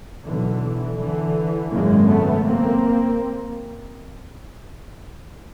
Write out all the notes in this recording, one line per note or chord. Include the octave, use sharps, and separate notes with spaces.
B1 B2 D3 E3
D3 E3
G#1 F#2 C#3 G#3 A#3
A3 B3
A#3 C4